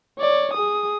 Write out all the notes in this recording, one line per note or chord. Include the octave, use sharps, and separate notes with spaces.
C#5 D5
G#4 D#6